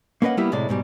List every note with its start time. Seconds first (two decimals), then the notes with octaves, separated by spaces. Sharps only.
0.22 A#3 C#4 B4 D#5 F#5
0.37 G3 A#3 B3 E4 G4
0.52 A2 C3 G#3 D5
0.69 G#2 B2 G3